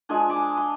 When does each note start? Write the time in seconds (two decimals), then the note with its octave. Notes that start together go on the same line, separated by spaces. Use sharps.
0.09 F3 G#3 D4 G#5
0.30 D6
0.36 C6
0.57 C6